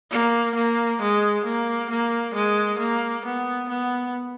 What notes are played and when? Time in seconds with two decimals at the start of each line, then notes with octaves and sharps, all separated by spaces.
0.11 A#3
0.55 A#3
1.01 G#3
1.45 A#3
1.90 A#3
2.35 G#3
2.79 A#3
3.25 B3
3.69 B3